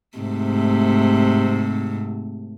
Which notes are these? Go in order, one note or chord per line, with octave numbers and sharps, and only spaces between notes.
G#2 C3 A3